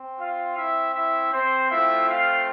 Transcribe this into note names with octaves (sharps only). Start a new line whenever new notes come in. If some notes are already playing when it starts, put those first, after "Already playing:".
Already playing: C4
F4 F5
E4 E5
E4 E5
C4 C5
A3 C4 E4 F4 E5
F4 F5